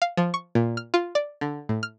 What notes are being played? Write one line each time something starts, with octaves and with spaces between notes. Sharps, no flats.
F5
F3
C#6
A#2
F6
F4
D5
D3
A2
F6